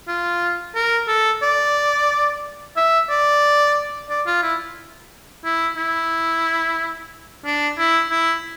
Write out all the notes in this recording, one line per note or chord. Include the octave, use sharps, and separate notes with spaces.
F4
A#4
A4
D5
E5
D5
D5
F4
E4
E4
E4
D4
E4
E4